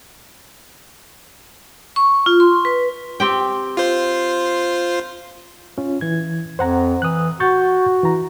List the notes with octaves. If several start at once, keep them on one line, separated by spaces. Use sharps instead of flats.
C#6
F4
C6
B4
C4 G4 G5
F4 C5
C#4 F4
E3 G#6
F2 C5 F#5 A#5
E3 D#6 F#6
F#4 C#6 G6 A6
E3 A#5